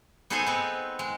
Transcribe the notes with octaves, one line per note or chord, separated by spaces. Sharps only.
B3 D#4 G#4 A4 C5 G#5
B3 C4
G#3